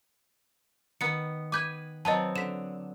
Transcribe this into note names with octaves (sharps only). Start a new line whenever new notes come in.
D#3 B3 C#7
B4 G#5 D6 G6 G#6
F#3 B3 C4 D#5 A5
D3 B6 E7